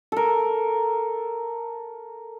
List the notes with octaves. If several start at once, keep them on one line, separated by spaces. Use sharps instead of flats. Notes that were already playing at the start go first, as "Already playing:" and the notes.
A4 A#4